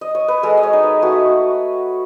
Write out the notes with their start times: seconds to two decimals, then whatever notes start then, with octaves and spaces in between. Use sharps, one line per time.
0.01 D#5
0.15 C#5
0.28 B4
0.43 G#3 A4
0.57 D#5
0.63 C#5
0.73 D#4
0.83 B4
1.02 A3 F#4